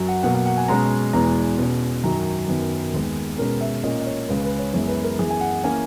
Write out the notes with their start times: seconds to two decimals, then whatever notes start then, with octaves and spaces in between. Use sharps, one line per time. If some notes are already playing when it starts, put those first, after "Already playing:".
Already playing: F#2 F#3
0.08 F#5
0.23 B2 F#3 A#3 F#5
0.35 F#5
0.46 F#5
0.57 G#5
0.68 B2 G#3 C#4 A#5
1.13 E2 B2 G#3 B3 A#5
1.58 B2 G#3 C#4
2.04 F#2 D#3 F#3 A#5
2.48 F#2 D#3 F#3 B3
2.94 D#2 D#3 G#3 B3
3.38 B2 G#3 C#4 A#4
3.61 E5
3.83 A#2 A#3 C#4 D#5
4.00 D#5
4.06 C#5
4.28 C#2 C#3 G#3 B4
4.44 B4
4.59 C#5
4.74 F#2 E3 G#3 B3 C#5
4.88 B4
5.03 A#4
5.19 F#2 E3 B3 G#4
5.31 G#5
5.41 F#5
5.64 E3 A#3 C#4 G#5